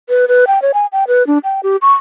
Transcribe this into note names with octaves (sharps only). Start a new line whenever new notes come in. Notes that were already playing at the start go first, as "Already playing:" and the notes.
B4
B4
G5
C#5
G#5
G5
B4
D4
G5
G4
C#6